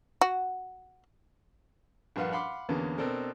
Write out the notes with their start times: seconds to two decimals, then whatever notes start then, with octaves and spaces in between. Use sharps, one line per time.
0.21 F#4
2.16 A#1 G2 B4 F5 F#5
2.32 F5 F#5 B5 C6 D6
2.69 E2 D3 A#3 B3 C#4
2.98 B2 C4 D4 A4 A#4